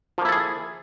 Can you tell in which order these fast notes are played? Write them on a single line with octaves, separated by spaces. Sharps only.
F3 A#3 E4 A4 G#4